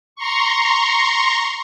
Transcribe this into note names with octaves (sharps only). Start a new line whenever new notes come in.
A#5 C6 C#6